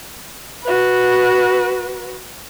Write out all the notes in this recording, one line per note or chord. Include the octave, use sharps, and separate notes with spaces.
F#4 B4